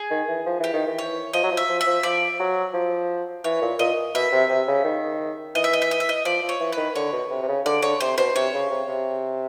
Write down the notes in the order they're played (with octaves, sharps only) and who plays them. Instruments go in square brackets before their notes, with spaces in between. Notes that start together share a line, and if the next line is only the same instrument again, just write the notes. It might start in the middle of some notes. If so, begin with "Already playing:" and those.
Already playing: [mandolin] G#4
[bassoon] D#3
E3
F3
[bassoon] E3 [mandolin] G4
[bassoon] D#3
E3
[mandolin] C#5
[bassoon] F3 [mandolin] D#5
[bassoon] F#3
F3
[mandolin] E5
[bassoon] F3
[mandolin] E5
[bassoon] F3
[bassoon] F3 [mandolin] D5
[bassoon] F#3
F3
[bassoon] E3 [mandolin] C#5
[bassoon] A#2
[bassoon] A#2 [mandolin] D#5
[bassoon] B2 [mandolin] E5
[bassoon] C3
C3
C#3
D#3
[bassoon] E3 [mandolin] D#5
[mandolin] E5
D#5
E5
D#5
E5
D#5
[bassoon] F3 [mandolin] D5
[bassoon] F3
[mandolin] C#5
[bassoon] E3
[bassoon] D#3 [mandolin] B4
[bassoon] D3 [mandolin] C#5
[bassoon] B2
C3
C3
C#3
[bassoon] D3 [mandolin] D5
[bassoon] D3 [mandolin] C#5
[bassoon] C3 [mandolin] C5
[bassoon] B2 [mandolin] C5
[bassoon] C3 [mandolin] C#5
[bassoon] C#3
C3
C3